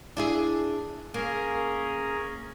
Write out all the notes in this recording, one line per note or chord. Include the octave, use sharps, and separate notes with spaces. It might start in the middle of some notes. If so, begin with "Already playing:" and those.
D4 E4 G#4
A#3 C#4 G#4 A#4